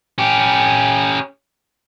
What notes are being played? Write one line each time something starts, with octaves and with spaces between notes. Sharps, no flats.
C#4 G4